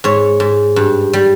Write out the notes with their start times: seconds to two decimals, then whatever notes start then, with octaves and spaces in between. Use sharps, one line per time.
0.04 G#2 C#5
0.40 G#2
0.76 G2
1.13 G3